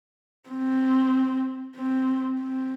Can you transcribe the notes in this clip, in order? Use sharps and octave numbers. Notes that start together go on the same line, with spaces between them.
C4
C4
C4